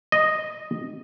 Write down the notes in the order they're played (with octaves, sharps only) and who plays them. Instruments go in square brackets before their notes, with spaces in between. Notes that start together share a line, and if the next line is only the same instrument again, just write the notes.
[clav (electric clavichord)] D#5